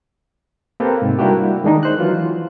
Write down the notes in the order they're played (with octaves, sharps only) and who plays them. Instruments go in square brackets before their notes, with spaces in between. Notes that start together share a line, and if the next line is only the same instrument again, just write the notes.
[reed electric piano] A#3 C4 G4 A4 B4
G#2 C3
G3 A#3 D4 E4 F#4 G4
D#3 G#3 D4 D#4
C5 F#6
E3 F#3 F4